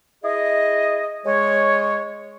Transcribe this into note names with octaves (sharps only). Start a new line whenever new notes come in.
E4 G#4 D#5
G#3 C#5